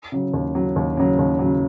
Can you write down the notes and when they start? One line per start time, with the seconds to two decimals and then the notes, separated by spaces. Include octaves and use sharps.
0.12 C#3 F#3
0.34 D#2
0.55 C#3 F#3
0.76 D#2
0.97 C#3 F#3
1.19 D#2
1.39 C#3 F#3